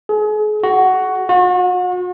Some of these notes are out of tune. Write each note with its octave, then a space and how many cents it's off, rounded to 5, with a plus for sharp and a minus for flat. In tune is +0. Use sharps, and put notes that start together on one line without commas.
G#4 +35
F#4 +10
F#4 -40